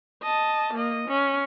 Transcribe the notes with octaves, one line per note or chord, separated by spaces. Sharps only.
D#5 A5
A#3 D#5
C#4